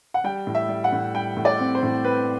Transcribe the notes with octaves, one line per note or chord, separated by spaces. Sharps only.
F#5
G3 G5
A2
E5
G3
F#5
A2
G3 G5
A2
D5
C4
C5
A2
C4 B4